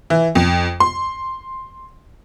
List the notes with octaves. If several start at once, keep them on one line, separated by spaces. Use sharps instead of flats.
E3
F2
C6